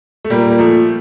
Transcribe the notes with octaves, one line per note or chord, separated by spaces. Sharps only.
A3
A#2 G3 A#3
A#3
F3 A3